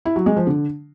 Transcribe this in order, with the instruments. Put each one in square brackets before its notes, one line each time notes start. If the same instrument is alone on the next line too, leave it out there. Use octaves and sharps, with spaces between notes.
[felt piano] E4
F#3
G#3
F3
D3